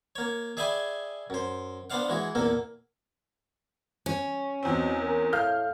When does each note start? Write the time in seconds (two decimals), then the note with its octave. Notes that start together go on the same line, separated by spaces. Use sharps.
0.16 A#3 C#5
0.57 G#4 D5 E5 G5 G#5 B5
1.30 F#2 C5
1.90 B3 D4 C5 D5 F5 F#5
2.09 E3 G#3 F#4
2.35 E2 A#2 A#3 A4
4.06 C#4
4.63 E2 B2 C4
5.01 A#4
5.33 A2 A4 F5 F6 G6